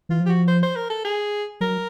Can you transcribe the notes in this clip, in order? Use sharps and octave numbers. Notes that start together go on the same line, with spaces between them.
E3 F4
F3
G4
F#4
C5
C5
A#4
A4
G#4
F#3 A#4